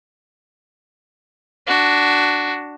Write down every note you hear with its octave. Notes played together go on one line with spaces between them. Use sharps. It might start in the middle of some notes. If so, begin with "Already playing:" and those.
D4 F#4